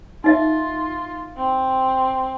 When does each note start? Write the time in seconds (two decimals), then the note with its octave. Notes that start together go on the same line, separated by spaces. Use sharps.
0.24 D#4 F4 D#5 E5
1.37 C4